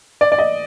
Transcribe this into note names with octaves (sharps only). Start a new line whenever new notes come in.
D5
D5
D#5